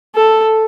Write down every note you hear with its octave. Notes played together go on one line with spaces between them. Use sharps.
A4